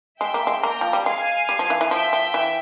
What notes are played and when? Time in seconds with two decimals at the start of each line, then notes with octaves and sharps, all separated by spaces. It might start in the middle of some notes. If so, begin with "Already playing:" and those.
0.21 G#3 E5 G5
0.34 A#3
0.47 G#3
0.63 A#3 G5 A#5
0.81 F3
0.93 G3
1.05 G#3 F5 G#5
1.49 G3
1.59 F3
1.70 E3
1.81 E3
1.91 F3 E5 G5
2.13 F3
2.34 E3